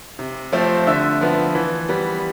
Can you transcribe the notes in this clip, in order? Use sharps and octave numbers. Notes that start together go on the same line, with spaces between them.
C3
F3 A3 C4
D3 E5 E6
F3 B3
E3
G3 B3